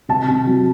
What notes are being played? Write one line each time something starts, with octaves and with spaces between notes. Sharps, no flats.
C3 A5
C3
F#3